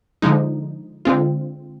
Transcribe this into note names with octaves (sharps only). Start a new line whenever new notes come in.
D3 F3 G#3 D#4
D3 G#3 C4 F4